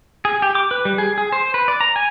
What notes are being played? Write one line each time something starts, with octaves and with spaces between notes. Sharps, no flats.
G#4
G4
D6
B4
G3
G#4
G#4
C5
B4
D5
A#5
G#5